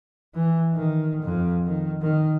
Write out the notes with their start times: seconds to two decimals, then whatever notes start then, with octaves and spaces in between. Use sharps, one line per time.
0.35 E3
0.74 D#3
1.22 F2
1.66 D#3
2.02 D#3